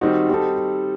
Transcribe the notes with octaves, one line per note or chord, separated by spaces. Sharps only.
D#3 G3 C4 D#4 F#4
G3 C4 D#4 A4